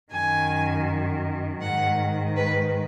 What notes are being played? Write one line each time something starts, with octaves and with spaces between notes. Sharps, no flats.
F#2 D#3 G#5
G#2 D#3 F#5
B4